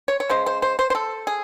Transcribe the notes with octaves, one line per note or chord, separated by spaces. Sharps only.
C#5
C#5
C#3 G#3 C5
C5
C5
C5
C5
A4
G#4